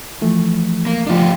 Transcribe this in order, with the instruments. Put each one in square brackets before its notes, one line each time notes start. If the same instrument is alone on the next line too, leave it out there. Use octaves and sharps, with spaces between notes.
[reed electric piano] E3 F3 A3
[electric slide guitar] A#3
[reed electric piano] F3 A3 [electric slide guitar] D4 F4 G4